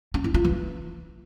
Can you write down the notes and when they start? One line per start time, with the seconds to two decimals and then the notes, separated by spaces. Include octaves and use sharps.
0.14 C#4
0.24 E4
0.34 F4
0.44 E3